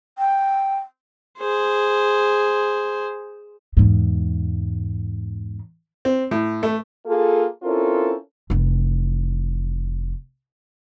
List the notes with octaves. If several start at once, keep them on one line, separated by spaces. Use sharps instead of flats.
G5
G#4 C5
E2 G#2
C4
A2
A3
A#3 F4 G#4 A4
C4 C#4 E4 F4 A4 A#4
F1 E3